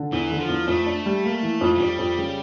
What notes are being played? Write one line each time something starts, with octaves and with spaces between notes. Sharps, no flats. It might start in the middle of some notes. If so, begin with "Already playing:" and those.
Already playing: D3
E2 E3
D3
F3
E2
F2 A3
D4
G3
A#3
E3
F2
A3
F2 G3
F2
C#3